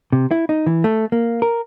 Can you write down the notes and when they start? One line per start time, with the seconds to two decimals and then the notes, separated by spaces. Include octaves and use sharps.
0.13 C3
0.31 E4
0.49 D#4
0.66 E3
0.84 A3
1.12 A#3
1.42 A#4